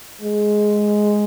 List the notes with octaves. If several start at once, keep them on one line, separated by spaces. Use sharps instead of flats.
G#3